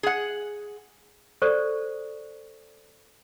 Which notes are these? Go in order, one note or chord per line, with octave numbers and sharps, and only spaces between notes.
G#4 F#5
A4 C5 D5 C#6